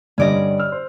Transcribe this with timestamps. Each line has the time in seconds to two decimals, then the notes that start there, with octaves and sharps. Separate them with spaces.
0.18 G2 D3 G3 C#4 D5 D#5
0.59 E6 F6
0.72 C5